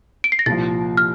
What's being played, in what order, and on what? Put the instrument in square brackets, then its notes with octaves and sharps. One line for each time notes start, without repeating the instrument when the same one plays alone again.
[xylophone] D7
C7
A#6
[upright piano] C2 A#2 F3 [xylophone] A6
[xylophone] F6